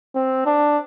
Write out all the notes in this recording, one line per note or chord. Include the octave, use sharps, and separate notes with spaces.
C4
D4